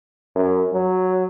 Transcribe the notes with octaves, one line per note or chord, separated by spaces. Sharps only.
F#2
F#3